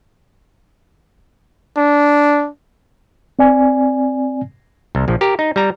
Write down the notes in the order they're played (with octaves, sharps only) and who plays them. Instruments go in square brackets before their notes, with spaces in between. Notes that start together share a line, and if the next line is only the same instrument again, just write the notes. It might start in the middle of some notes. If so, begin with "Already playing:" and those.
[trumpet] D4
[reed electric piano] C4 D5 G#5
[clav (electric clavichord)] C2
A#1 F3
G4 A#4
D#4
G3 A#5